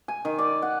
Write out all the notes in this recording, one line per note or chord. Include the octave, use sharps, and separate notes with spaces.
G#5
D#3
D5
F#5